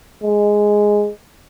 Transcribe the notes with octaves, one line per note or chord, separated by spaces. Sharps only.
G#3